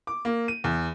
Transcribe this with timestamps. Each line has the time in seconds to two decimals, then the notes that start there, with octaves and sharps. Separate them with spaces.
0.07 D6
0.25 A#3
0.48 D#7
0.64 E2